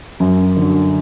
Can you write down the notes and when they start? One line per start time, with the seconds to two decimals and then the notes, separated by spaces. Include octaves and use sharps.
0.20 F#2
0.57 D3 F#3